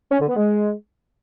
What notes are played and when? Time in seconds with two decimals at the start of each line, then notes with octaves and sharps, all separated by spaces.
0.11 C#4
0.20 D3
0.28 B3
0.37 G#3